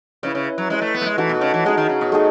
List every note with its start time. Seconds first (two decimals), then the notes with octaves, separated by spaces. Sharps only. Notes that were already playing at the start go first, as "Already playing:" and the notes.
0.23 C#3 E4 B4 D#5
0.35 C#3
0.58 F#3
0.70 G#3 E4 B4 E5
0.82 A3
0.94 B3
1.01 A3
1.06 G#3
1.18 E3 A3 D#4 F#4
1.29 B2
1.41 C#3
1.54 E3
1.65 G#3 D#4 G#4 D#5
1.77 D#3
1.89 C#3
2.01 B2
2.12 A3 D#4 G#4